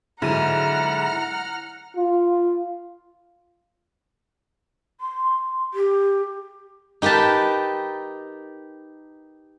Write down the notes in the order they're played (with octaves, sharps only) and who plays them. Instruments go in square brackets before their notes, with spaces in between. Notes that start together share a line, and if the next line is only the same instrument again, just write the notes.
[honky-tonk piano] G#2 D#7 [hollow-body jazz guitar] D3 F#3 [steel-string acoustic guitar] E4 [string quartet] F#5 A#5 F6
[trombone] F4
[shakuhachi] C6
G4
[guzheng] D#4 G4 A#4 B4 A5